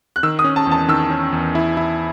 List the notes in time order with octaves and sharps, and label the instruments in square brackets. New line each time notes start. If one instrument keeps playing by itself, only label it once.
[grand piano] F#6
[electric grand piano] D#3 [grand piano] E6
[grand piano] D#6
[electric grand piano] C#4
[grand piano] A5
[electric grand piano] E2 [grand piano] A5
[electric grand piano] D#3 [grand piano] E6
[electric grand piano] C#4
E2
E4
E4